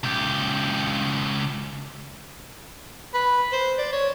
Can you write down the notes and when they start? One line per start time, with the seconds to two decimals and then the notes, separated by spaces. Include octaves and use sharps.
0.04 C#2 G4
3.14 B4
3.52 C5
3.78 D5
3.92 C#5